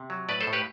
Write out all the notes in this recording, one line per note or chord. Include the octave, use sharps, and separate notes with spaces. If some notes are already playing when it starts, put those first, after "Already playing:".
Already playing: C3
F#3
A2 B4 D5
A4 C5
A2
G4 B4